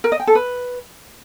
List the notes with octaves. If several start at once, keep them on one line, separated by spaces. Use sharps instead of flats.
A#4
D#5
G5
A4
B4